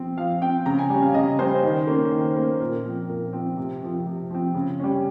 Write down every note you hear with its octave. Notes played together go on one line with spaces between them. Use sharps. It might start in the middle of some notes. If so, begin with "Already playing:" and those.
Already playing: F3 C4
F3 F5
C4 G5
C#3 A#5
G#5
G3 C#4
F5
C#3 D#5
G3 C#4 C5
D#3
A#3 C#4
D#3
A#3 C#4
A#2 A#4
F3 C4
A#2 A#4
F3 C4
C3
F3 C4
C3
F3 C4
C#3
G3 C#4